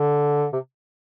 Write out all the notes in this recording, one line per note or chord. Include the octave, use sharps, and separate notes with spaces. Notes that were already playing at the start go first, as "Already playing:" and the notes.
Already playing: D3
C3